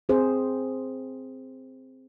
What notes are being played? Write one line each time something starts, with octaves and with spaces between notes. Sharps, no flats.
C4 G#4 C5